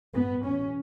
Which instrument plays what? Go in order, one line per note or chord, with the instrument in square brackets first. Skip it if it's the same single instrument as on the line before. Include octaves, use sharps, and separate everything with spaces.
[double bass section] G2 B3
E2 B2 C#4